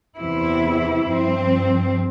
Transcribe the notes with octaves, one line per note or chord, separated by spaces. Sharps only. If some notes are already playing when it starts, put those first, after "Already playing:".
E2 C3 E3 E4
G2 F3 C4